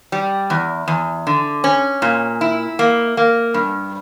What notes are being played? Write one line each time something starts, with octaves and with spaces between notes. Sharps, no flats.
G3
E2
E2
D3
C#4
A#2
E4
A#3
A#3
G2